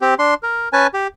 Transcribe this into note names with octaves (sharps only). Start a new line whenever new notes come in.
C4 G4
D4 C6
A#4
C#4 B4 G#5 A5
G4